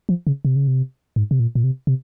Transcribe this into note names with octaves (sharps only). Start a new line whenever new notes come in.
F3
C#3
C3
C#3
C3
G#2
C3
A#2
A#2
C3
C3